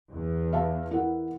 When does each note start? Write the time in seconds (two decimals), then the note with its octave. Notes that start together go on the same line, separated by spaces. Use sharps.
0.12 E2
0.53 E5 F5 A5
0.91 E4 A#4 F#5